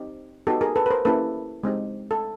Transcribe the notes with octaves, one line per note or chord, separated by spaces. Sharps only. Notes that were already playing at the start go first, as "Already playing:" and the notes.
Already playing: C4 D#4 G4
B3 D#4 F#4 G4 A4
G#4 A#4
A4 B4
B4
A#4 C5
A#3 C#4 E4 G4 A4 B4
G#3 C4 D#4 G4
A4